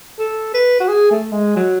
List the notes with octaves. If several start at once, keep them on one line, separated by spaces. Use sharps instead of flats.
A4
B4
F#4
G#4
A3
G#3
F#3